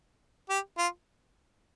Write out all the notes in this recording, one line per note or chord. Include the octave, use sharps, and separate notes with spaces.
G4
F4